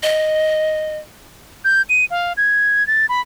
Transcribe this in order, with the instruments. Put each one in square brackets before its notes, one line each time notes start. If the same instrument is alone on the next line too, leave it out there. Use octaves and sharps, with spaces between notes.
[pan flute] D#5
[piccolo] G6
D#7
F5
G#6
A6
B5